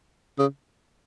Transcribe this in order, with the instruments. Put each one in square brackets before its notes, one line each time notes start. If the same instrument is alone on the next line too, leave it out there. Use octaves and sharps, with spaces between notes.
[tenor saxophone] C#3